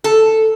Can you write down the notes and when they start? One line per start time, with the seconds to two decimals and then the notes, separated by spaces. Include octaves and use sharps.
0.04 A4